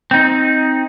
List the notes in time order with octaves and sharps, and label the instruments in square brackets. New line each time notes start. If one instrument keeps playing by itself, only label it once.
[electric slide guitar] C4 D#4